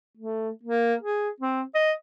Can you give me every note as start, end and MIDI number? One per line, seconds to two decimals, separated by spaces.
0.17 0.50 57
0.63 0.94 58
1.02 1.29 68
1.40 1.62 60
1.75 1.92 75